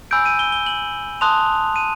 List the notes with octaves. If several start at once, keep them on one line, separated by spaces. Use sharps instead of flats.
G#5 B5 E6 G6 D7
D#7
G7
G7
F#7
A5 C6 D#6 F#6 F7
D#7